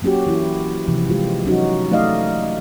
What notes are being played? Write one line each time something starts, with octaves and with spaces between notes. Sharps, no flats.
F#3 A#3 C#4 F#4 G4
E3 E4
C3 E3 F3
G3 G#3 F4 G4
F#3 C#4 D#4 F#4
F#3 A3 D#4 D5 D#5 F5